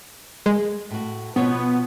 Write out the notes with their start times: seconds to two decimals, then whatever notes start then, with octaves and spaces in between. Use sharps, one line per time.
0.46 G#3
0.91 A2 F#4
1.36 B2 F3 B3 C#5